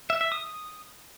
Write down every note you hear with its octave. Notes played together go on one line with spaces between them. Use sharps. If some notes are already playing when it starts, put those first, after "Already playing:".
E5
E5
D#6